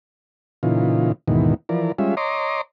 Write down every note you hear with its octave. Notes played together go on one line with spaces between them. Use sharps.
A#2 C#3 E3 D#4 F4
D#2 G#2 B2 D#3 E3
E3 F3 A#4 D5
G3 G#3 C#4 F4 E5
C#5 D#5 A#5 C6 D6